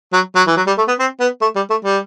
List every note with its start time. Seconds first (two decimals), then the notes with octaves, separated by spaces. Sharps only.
0.13 F#3
0.35 F#3
0.47 E3
0.57 F#3
0.67 G3
0.78 A3
0.88 B3
0.99 C4
1.20 B3
1.41 A3
1.56 G3
1.70 A3
1.85 G3